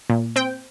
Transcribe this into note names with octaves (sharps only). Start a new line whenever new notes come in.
A#2
C4 G5